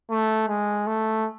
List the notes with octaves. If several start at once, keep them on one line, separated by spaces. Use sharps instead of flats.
A3
G#3
A3